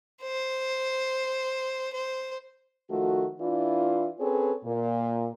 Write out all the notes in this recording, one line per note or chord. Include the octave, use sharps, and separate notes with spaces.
C5
C5
D#3 F3 A3 F#4
E3 D4 E4 F4
C4 C#4 G#4 A4 B4 C#5
A#2